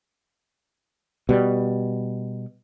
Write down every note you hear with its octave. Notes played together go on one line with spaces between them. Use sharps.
B2 G3